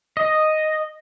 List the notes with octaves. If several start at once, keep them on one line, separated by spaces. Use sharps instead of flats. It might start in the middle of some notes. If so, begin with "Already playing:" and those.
D#5